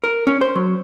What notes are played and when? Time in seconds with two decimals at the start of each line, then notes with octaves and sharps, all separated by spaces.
0.04 A#4
0.27 C#4
0.41 C5
0.55 F#3